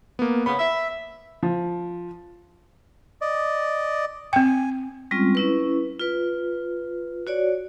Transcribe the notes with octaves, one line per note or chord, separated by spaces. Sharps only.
A#3 B3
C#3 B3 B5
E5
F3
D5 D#5
C4 G5 G#5
G3 G#3 C4 C#4 F4
C#4 E4 B4
F4 B4
F#4 C#5 D5